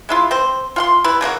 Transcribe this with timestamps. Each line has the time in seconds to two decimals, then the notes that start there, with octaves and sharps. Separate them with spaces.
0.09 G#3 E4 F4
0.31 C4 C5
0.76 F4 F#5 C6
1.04 G3 E4 B4
1.21 C#3 A#3 D#4 F#4